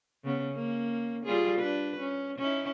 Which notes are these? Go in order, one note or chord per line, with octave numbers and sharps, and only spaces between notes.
C#3 B3 C#4
A#3 C#4
G3 F4 G#4
D4 B4
C#4
C#4 D#4 E4